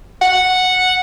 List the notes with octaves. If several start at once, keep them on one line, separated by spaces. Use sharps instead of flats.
F#5